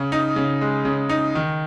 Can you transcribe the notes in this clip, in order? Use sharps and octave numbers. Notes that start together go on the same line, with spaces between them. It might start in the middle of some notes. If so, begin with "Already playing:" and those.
Already playing: C#3
D#4
C#3
G#3
C#3
D#4
D#3